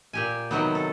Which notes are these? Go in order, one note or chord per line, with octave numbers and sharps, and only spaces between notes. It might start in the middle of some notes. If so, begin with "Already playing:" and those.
A#2 G4 G#5
C3 D#3 F#3 B3
A4